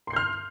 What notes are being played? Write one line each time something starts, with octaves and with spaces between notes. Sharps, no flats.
C6 F6 G6 C7